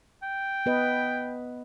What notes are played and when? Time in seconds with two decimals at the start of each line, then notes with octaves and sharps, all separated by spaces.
0.23 G5
0.66 B3 B4 D#5